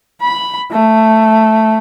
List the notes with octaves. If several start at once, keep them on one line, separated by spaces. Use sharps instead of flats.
B5
A3